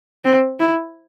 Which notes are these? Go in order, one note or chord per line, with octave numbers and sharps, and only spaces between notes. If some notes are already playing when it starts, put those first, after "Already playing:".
C4
E4